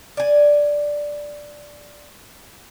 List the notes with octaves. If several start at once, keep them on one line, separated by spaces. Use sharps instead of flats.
D5 G#5